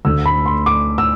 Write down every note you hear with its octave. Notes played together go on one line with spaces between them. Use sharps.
D2 D3 A3 E6
B5
C6
D6
E6